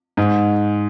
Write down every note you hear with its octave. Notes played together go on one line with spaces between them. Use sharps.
G#2